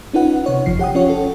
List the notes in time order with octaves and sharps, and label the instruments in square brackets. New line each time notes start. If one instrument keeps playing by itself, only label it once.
[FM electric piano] C#4 D#4 F4 B4 F#5
C3 C#5
G1 F#2 F3 C7
G4 F#5 G5 D#6
C#4 F4 C#5
A4